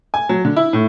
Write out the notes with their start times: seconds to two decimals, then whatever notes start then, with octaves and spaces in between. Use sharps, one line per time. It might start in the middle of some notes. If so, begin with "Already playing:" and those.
0.14 G#5
0.29 F#3
0.45 D3
0.56 E4
0.73 A2